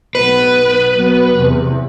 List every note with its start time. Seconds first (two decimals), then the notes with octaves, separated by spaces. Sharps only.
0.15 B1 B3 B4
0.94 F#3 B3
1.38 E2 C3